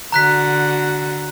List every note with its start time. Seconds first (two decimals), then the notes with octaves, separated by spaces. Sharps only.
0.12 D3 F#4 A#5 F#6 B6